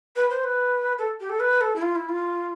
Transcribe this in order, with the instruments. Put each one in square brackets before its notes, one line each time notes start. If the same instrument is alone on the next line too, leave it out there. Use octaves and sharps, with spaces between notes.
[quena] B4
C5
B4
A4
G4
A4
B4
A4
E4
F4
E4
F4